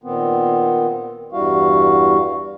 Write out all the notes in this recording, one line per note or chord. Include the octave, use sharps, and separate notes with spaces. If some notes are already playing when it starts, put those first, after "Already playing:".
A#2 D#3 B3 C4
E2 G2 G3 E4 F#4 F5